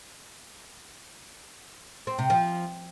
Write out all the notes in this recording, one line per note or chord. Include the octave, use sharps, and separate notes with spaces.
C4
C3
F3